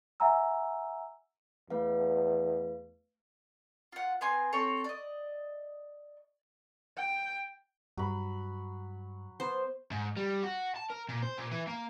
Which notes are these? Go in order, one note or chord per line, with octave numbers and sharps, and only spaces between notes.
E5 F#5 G#5 A#5 E6
E2 A3 B4 F5
F4 F#5
B3 C4 G#5 C6
C4 A4 C#5
D5 D#5
G5
G2 F#3 B5
B3 C5
G#2
G3
F#4
A5
A#4
A#2
C5
A#2
E3
A#3